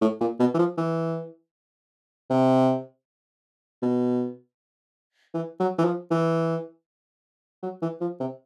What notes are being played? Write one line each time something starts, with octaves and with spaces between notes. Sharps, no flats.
A2
A#2
B2
E3
F3
E3
C3
B2
E3
F#3
E3
F3
E3
F#3
E3
F3
C3